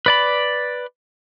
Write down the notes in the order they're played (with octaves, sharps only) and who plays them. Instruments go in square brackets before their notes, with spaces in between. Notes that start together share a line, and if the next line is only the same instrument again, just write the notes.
[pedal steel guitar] B4 D5 B5